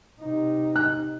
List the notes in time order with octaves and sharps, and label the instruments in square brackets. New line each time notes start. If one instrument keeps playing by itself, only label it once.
[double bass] C3 D#4
[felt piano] F#6